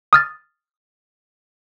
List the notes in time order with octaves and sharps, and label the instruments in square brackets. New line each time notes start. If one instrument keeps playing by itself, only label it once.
[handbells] D#6 F6 A6